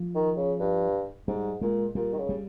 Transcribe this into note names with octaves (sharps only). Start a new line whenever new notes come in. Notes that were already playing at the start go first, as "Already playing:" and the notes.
Already playing: F3
D#3
C#3
G2
G#2 G3
A#2 G#3
A#2 G3
D#3
C#3
G3